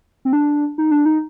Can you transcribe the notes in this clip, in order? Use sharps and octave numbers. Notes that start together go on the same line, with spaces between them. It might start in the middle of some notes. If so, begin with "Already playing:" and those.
C4
D4
D#4
D4
D#4